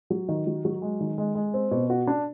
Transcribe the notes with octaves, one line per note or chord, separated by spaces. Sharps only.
F#3
D#3
F#3
F#3
G#3
D#3
G#3
G#3
C4
B2
F#4
D4